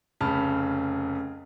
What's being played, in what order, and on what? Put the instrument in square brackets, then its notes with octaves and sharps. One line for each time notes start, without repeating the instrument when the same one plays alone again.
[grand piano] F1 C#3 A5 B5 F6